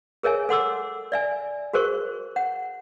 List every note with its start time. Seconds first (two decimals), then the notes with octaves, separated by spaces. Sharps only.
0.23 G#4 A#4 C#5 E5 G#5
0.49 A4 F#5 C6 D6 E6
1.12 D5 E5 G#5
1.73 F#4 G#4 A#4 C5 C#6
2.36 F#5